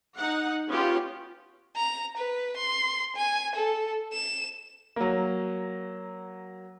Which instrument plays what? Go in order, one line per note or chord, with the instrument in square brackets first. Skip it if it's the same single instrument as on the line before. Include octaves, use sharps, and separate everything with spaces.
[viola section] D#4 F#5
B3 C#4 F4 G4
[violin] A#5
B4
C6
G#5
A4
E7
[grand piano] F#3 A#3